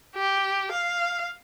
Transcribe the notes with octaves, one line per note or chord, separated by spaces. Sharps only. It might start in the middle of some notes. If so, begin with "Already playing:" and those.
G4
F5